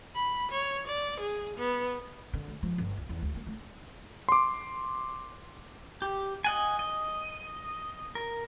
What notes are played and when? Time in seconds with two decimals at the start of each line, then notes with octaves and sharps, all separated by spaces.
0.15 B5
0.51 C#5
0.87 D5
1.20 G#4
1.57 B3
2.34 D3
2.48 D2
2.63 F3
2.78 G1
2.97 C#2
3.09 E2
3.22 D2
3.35 A#3
3.47 A3
4.29 C6 D6
6.02 G4
6.44 D#5 F#5 G#5
6.79 D#5
8.15 A#4